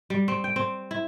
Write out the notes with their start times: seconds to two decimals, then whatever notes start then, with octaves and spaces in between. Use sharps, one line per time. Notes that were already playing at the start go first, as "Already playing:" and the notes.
0.10 G3
0.28 C4
0.44 G5
0.56 C4
0.91 E4